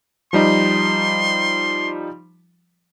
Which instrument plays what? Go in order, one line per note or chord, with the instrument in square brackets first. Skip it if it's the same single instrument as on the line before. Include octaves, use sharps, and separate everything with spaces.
[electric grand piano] F3 G3 D#4 [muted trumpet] C6